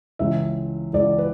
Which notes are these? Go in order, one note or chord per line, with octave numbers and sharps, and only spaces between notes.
C#2 C#3 E3 E5
C#2 C#3 E3 D5
B4